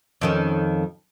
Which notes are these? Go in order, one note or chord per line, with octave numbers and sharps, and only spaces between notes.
F2 D#3 C#4